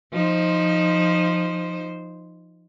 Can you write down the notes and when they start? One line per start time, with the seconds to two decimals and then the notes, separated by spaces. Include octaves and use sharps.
0.13 F3 D#4 C5